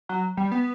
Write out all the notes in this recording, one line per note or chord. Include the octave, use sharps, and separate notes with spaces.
F#3
G3
B3